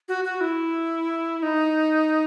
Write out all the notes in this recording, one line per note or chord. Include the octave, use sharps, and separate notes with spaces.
F#4
F#4
E4
E4
D#4